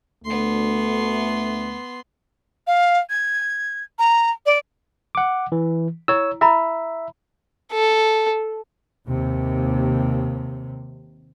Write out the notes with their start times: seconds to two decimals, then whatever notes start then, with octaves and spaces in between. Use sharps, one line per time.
0.25 D2 A3 B3 C6
2.67 F5
3.10 G#6
3.99 A#5
4.46 D5
5.15 F#5 D6
5.52 E3
6.08 E4 C#5 E6
6.41 E4 E5 A#5 B5
7.72 A4
9.06 D#2 C3